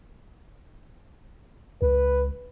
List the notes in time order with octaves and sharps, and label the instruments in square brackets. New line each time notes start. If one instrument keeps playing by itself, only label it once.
[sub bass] C#2 [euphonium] B4